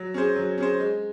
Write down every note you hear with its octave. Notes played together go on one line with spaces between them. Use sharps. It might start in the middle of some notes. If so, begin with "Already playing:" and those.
Already playing: F#3
C#4 G#4 C5
F#3
C#4 G#4 C5
G#3